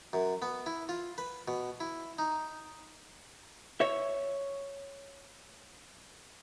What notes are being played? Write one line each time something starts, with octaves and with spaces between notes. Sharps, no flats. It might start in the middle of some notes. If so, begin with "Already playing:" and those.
F#2
B3
E4
F4
B4
B2
E4
D#4
C#5 E5